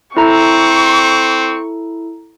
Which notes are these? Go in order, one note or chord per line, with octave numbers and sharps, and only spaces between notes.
C4 E4 A4 A#5 C#6